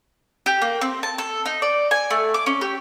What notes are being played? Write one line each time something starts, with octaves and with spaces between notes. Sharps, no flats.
G4
A#3
C4
A5
A4
D#4
D5
G#5
A3
D6
C#4
G4